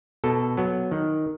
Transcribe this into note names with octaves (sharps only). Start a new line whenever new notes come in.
B2 A4
F#3 B3
D#3